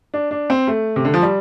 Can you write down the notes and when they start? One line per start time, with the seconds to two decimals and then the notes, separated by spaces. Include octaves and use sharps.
0.14 D4
0.31 D4
0.50 C4
0.68 A3
0.96 C3
1.05 D3
1.14 F3
1.22 G3